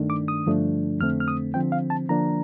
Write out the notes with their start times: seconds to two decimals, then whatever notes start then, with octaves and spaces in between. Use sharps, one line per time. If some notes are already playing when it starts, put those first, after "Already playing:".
Already playing: G2 D#3 A3 D4
0.10 D6
0.28 D#6
0.46 G2 D3 F3 A3 D4
1.00 F2 D3 A3 C4 F6
1.20 F6
1.28 D#6
1.54 D3 F3 C4 G5
1.72 F5
1.90 A5
2.09 D3 F3 A#3 D4 A#5